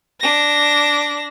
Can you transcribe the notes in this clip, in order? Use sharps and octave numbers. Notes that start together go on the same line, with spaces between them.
D4 A#6